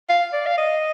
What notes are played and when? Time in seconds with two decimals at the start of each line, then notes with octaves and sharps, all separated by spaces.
0.09 F5
0.33 D5
0.46 F5
0.58 D#5